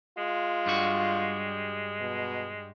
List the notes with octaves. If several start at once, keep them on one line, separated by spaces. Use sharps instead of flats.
G#3 F4
G2 G3 F#4
B2